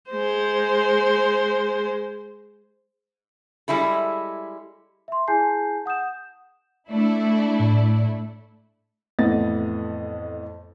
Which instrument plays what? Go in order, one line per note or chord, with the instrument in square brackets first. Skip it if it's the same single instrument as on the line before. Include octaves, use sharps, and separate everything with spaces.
[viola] G#3 C5
[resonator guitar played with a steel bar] G3 G#3 E4 A4
[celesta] E5 C6
E4 G#4 G#5 A5 G6 C7
F#5 D#6 G6 E7
[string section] A3 D4 E4
[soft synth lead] A2
[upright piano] F2 A2 E3 B3 D#5 A6